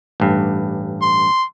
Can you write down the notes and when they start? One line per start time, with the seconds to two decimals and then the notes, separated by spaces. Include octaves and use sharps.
0.20 A1 G2
1.02 C6